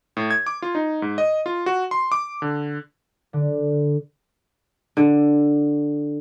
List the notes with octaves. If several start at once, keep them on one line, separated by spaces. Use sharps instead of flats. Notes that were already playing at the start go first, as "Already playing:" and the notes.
A2
G#6
D6
F4
D#4
G#2
D#5
F4
F#4
C6
D6
D3
D3
D3